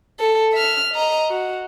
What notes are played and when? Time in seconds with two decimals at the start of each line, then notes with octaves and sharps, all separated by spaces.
0.19 A4
0.53 E5 F6
0.94 D#5 A#5
1.30 F#4